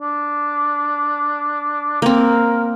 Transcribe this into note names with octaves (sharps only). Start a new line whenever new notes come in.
D4
A#3 C4 A#4